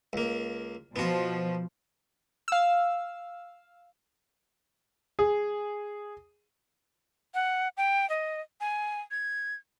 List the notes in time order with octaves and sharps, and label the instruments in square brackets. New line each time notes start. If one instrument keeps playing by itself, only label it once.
[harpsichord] C#2 A#3
[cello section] B2 F3 [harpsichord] B3 F#4
[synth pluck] F5 E6
[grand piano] G#4
[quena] F#5
G5
D#5
G#5
G#6